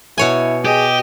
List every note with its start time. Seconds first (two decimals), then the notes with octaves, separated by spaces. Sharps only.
0.18 B2 E4 C#5 G#5
0.65 G4 G#4 D#5